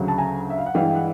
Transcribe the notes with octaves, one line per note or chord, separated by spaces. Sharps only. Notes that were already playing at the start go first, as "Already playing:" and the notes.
Already playing: D2 C#3 F#3
A5
G#5 A#5
E5
F5
F#5
G2 E3 G#3 F5 G5
F#5